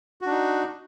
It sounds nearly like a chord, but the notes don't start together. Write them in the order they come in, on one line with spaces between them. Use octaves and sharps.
F#4 D4 D#4